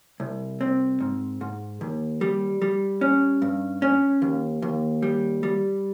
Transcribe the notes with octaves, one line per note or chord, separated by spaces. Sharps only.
C2
C4
G#2
G#2
D#2
G3
G3
C#4
G2
C#4
D#2
D#2
G3
G3